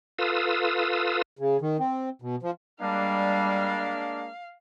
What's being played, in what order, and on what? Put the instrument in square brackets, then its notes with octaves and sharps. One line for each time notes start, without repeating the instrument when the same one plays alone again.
[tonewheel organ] F4 A4 B4 F5 D#6 E6
[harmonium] C#3
D#3
C4
B2
F3
[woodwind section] G3 [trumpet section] G#3 A#3 D4 [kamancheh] F5